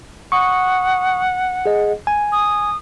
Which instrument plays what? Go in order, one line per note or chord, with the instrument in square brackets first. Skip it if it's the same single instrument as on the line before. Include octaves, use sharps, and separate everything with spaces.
[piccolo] F#5 [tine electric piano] C#6 D#6
[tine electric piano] G#4 D#5
G#5
[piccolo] D#6